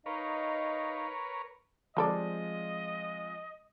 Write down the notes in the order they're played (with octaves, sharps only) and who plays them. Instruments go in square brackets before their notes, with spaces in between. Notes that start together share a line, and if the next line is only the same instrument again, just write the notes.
[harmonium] D#4 D#5 F5 [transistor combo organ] A#4 B4 C#5
[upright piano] F3 G#3 C4 [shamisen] G3 A4 D5 [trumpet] D#5